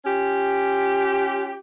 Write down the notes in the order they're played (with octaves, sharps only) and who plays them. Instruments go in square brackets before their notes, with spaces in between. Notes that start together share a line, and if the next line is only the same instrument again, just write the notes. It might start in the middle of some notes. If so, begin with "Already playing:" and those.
[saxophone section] C#4 F4 G4